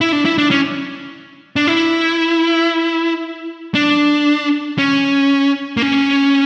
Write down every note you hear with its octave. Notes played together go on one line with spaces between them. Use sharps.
E4
D4
E4
D4
C#4
D4
E4
D4
C#4
A#3
C#4